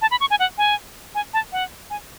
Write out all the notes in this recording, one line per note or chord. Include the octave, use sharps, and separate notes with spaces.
A5
B5
C#6
G#5
F#5
G#5
G#5
A5
F#5
G#5